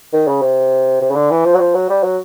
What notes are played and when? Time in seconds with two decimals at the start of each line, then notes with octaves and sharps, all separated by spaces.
0.13 D#3
0.27 C#3
0.42 C3
1.02 C3
1.10 C#3
1.15 D3
1.31 E3
1.45 F3
1.54 F#3
1.59 F3
1.75 F#3
1.89 G3
2.03 F#3